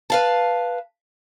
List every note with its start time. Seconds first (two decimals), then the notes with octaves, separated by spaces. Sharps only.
0.10 B4 F5 A5